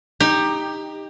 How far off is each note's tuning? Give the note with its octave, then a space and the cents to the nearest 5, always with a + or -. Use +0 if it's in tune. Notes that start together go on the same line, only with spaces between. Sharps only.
D#4 +0 G4 +15